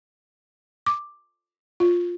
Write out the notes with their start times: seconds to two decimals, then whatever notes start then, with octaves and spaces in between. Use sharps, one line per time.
0.86 D6
1.80 F4